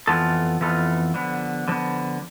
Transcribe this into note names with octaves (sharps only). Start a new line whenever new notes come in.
F2 E3 B3 F4 A4
F2 E3 B3 F4 A4
D3 F3 B3
D3 F3 B3